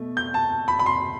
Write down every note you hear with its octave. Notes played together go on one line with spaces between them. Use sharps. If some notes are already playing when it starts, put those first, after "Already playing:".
Already playing: B2 A3
G6
A5
B5
B5
C6